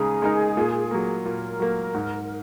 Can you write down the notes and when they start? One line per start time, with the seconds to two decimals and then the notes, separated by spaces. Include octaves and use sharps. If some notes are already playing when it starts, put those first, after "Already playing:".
Already playing: C#3 G#3 D#4 G#4 A#4
0.22 G#3 D#4 A#4
0.57 A#2
0.91 F#3 A#3
1.25 A#2 A#4
1.60 F#3 A#3
1.94 G#2